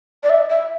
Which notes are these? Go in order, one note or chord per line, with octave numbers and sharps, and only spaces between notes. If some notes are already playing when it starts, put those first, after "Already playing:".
D5
E5
E5